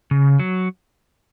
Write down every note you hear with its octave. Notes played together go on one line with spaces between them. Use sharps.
C#3
F#3